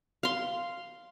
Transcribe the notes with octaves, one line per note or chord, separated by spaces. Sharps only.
F5 C6